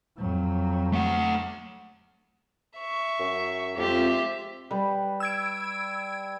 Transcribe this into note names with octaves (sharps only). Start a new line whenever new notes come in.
F2 F#3
A3 F#5
E5 C#6
F#2
F2 G#3 C4 F4 G4 E5
G3 B4
E6 G#6 D7